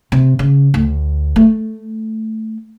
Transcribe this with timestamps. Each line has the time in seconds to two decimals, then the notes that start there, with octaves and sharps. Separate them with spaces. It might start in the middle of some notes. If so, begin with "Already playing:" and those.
0.12 C3
0.39 C#3
0.74 D2
1.36 A3